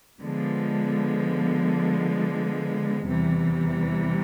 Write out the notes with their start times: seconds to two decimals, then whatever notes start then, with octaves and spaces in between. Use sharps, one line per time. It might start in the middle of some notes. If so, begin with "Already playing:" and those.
0.20 D3 F3 G#3 B3
3.04 E2 C3 E3 G3